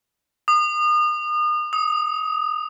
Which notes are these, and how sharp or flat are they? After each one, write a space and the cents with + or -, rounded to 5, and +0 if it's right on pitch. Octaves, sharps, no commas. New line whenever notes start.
D#6 -35
D#6 +25